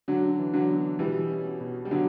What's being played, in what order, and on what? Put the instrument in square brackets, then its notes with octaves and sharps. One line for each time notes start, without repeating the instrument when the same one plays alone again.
[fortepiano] D3 F#3 [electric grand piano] D4
[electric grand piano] E3
[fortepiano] D3 F#3
[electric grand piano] B3
[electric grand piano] B2 [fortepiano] E3 G3
[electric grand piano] C#4
B2
[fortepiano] G3
[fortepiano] D3 F#3 [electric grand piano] B3